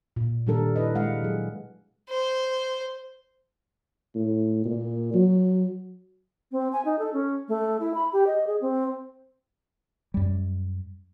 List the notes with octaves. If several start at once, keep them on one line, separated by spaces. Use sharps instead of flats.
A#2
A#2 D#3 G3 D4 A4 A#4
E4 A4 B4 D#5
G#3 F5 F#5
F#3 G#4
C5
A2
A#2
F#3
C4
G#5
D#4
A4
C#4
A3
E4
B5
G4
D#5
G#4
C4
F#2 G3